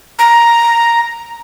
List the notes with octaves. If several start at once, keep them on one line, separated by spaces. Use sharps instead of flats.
A#5